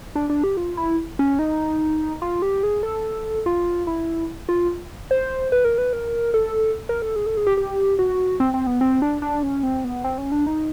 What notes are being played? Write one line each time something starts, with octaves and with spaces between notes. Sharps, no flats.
D4
D4
G4
F4
E4
C#4
D#4
F4
G4
G#4
A4
F4
E4
F4
C5
B4
A#4
B4
A#4
A4
A#4
A4
G#4
A4
G#4
G4
G4
F#4
C4
C4
B3
C4
D4
D4
C#4
C4
B3
C4
C#4
D4
D#4